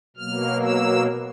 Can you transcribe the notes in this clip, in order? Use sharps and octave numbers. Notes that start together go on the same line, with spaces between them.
B2 F#3 A#3 F6
E6